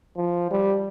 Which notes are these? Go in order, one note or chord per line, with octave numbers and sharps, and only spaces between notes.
F3
G3